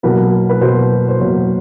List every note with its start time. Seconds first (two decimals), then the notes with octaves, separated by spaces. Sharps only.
0.03 B2 F#3 A#3 B4
0.49 B4
0.61 B2 F#3 A#3 C5
1.09 C5
1.20 B2 F#3 A#3 C#5